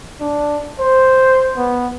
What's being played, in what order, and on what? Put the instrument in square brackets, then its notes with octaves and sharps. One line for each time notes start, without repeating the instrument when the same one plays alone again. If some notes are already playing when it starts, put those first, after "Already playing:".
[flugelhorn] D4
C5
B3